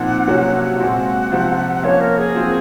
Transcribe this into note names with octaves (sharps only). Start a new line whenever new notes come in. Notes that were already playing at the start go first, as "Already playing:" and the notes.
Already playing: A#2 F3 C4 D#4 F#5
C3 F#3 A#3 C#4 F#4
A#2 G#3 C4 F#4 F#5
C3 F3 C4
F3 A#3 C#4 C#5
A#4
G#4
F3 C4 F#4